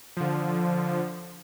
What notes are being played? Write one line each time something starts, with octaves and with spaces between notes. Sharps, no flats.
D3 F3